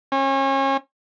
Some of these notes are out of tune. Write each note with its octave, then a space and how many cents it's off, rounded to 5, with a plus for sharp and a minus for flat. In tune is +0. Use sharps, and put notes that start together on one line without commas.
C#4 -35